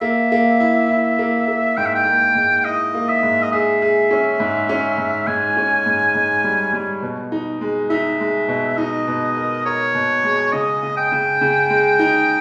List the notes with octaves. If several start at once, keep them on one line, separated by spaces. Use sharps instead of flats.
A#3 E5
A#3
E4
E4
A#3
A#3
G#2 G5
E5
G5
A#3
G#2
E4 D#5
A#3
E5
G#2
D#5
G#4 E5
G#4
C#4
G#2
C#4
G#2
G#2 G#5
C#4
G#2
G#2
G3
G3
B2
D#4
G#3
D#4 E5
G#3
B2
D#4 D#5
B2
A#4
A#4 C#5
B2
G#3
C#3 D#5
C#3
G5
C#3
C#3
G#3
D#4